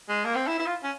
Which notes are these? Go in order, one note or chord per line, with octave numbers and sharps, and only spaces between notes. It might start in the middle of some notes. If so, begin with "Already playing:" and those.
G#3
A#3
C4
E4
E4
F4
C#4